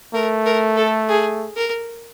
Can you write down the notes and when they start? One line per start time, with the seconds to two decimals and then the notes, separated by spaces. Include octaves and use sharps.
0.14 A3 A#4
0.46 A#4
0.77 A4
1.09 G#4
1.56 A#4